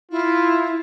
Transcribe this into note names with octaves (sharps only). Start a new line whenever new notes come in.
E4 F4